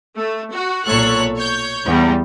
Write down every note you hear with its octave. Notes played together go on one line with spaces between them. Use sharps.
A3
F#4
B1 A#2 A4 C#5 C#6 F#6
C#5 G6
E2 G3